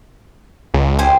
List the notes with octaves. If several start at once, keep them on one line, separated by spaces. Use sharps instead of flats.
C#2
G4 C5 G#5